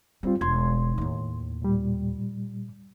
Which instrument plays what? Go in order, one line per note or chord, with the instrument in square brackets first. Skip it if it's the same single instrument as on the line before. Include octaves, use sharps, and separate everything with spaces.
[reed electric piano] G3 C4 F4 [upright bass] C#4
[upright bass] E1 [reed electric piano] C6 G#6
[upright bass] D#2 A2
[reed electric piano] A#2 G3